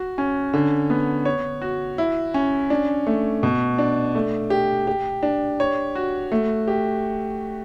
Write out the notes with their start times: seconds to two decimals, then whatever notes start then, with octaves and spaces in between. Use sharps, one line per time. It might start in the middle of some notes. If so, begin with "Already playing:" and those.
Already playing: F#4
0.18 C#4
0.54 D3
0.90 B3
1.25 C#5
1.62 F#4
1.98 E4
2.34 C#4
2.70 D4
3.07 A3
3.43 B2
3.78 D4
4.15 A3
4.50 G4
4.87 G4
5.23 D4
5.60 C#5
5.95 F#4
6.32 A3
6.68 G4